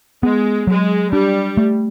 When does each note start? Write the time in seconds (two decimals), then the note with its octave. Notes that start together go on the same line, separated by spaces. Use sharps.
0.23 G#3 B3
0.67 F#3 G#3
1.12 G3 D4
1.57 A3